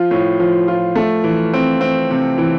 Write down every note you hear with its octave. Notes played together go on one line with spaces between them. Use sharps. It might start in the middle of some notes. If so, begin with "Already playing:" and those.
Already playing: F3 F4
A2
F3
F4
A3
E3
C4
C4
C3
E3